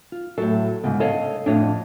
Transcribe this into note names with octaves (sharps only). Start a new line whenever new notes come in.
F4
A2 F#3 A4
C2 G#2 C#3 B3
A4 C#5 D#5 F5
F2 A2 D4 C#5 D#5